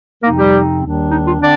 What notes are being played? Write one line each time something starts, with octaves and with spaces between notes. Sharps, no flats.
F2 C3 F3 A#3 C4 D#4 A#4
G3 G4
D#2 D#3 G3 D4
D#4
F4
D3 C4 D4 D5